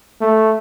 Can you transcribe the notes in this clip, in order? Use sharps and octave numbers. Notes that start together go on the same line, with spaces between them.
A3